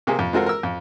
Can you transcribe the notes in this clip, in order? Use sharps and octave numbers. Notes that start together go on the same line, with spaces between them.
C3 A#3 G4 G#4
F2
G#3 C4 F4 F#4 A4 A#4
A#4 E6
F2